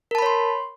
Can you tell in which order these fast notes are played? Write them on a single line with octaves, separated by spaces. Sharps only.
A#4 A5 B5 C#5 C6